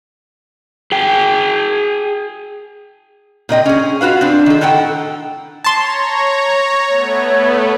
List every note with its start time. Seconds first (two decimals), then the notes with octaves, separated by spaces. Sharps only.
0.92 G#4 G5
3.49 A#2 C4 D#5 G5
3.65 C#4 G#4
4.01 F4 F#4 B4 F5
4.21 C4 D4
4.46 D#3 A4
4.61 A2 D#3 A4 F#5 G5
5.64 C#5 A5 A#5 C6
6.87 A3 B3 C#5